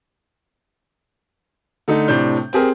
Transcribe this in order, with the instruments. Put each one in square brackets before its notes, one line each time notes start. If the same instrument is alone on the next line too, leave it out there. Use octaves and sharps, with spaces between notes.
[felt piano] D3 A3 D#4
A2 C3 D4 G6
C4 G4 G#4 A#4